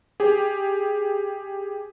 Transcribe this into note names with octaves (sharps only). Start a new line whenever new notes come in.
G4 G#4